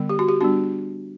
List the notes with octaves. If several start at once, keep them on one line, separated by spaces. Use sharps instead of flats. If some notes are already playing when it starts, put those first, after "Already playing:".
Already playing: D3 G3 B3
G4
F#4
G4
G3 B3 D4 F#4